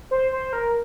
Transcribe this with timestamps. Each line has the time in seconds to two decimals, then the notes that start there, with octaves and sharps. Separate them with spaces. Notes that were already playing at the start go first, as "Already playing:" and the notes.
0.11 C5
0.32 C5
0.53 A#4